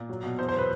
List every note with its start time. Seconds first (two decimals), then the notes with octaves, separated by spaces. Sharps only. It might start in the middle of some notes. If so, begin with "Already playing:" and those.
Already playing: A#2
0.09 F#3
0.23 B2
0.38 E2 C5
0.49 C5
0.54 F#3 B4